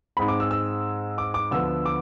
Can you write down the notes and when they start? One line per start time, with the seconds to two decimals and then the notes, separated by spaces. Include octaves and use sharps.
0.17 G#2 G#3 C4 B5
0.28 D6
0.40 E6
0.51 E6
1.18 D6
1.34 D6
1.51 D2 D3 F3 B3 E6
1.86 D6